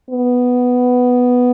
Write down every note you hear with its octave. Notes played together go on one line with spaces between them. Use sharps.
B3